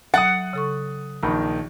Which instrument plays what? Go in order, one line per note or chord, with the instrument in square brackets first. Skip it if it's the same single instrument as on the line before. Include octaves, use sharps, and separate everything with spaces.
[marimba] F#3 [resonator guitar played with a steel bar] F#5 [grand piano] D#6 F#6 A6
[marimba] C#3 A4 C#6
[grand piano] A#1 D#3 [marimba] B5